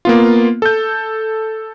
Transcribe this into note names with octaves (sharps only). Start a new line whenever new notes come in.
A#3 B3 F4
A4 G6